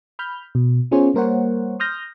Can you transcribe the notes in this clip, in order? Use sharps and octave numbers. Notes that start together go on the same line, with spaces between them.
B5 F6 G6
B2
B3 C#4 F4 G#4 C5 C#5
G3 A#3 A#4 C5 C#5 F#5
C6 D#6 F6 G6 A#6